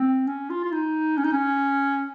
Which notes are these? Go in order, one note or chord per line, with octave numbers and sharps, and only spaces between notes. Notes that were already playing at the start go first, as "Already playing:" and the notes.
Already playing: C4
C#4
F4
F4
D#4
C#4
D#4
C#4